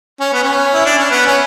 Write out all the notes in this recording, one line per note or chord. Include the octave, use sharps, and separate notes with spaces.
C#4
B3
C#4
E4
D4
C#4
B3
C#4